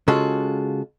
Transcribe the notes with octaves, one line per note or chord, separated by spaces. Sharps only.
C#3 G#3 F4 F#4 A4